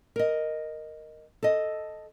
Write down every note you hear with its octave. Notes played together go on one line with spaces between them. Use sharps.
A#4 D#5
A4 D#5